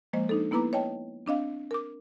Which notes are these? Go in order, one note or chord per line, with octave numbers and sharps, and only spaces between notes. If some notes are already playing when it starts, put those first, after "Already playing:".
F3 G#3 A#3 C5 D#5
D4 D#4 A4
A#3 B3 E4 B4 A#5 D6
C#5 D#5 G5 A5
C4 D4 D#5 F5
A#4 D6